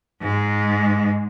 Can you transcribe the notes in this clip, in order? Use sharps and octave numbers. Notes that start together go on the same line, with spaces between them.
G#2 G#3